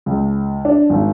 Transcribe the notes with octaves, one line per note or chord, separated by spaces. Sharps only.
C#2
D4
G#1